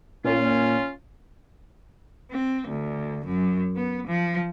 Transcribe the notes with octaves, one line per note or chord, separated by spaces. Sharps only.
A#2 C#4 F4
C4
D2
F#2
B3
F3